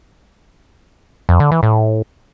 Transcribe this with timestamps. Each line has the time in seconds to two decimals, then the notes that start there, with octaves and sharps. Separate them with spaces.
1.29 F2
1.40 D3
1.51 E3
1.63 A2